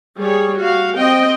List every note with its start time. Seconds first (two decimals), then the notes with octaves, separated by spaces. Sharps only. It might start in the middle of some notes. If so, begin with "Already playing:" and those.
0.18 G3 G#4 C#5
0.57 F#4 F5
0.95 C4 D#5 G5